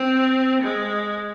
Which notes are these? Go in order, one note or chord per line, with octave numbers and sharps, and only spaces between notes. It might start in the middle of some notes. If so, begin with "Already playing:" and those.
Already playing: C4
G#3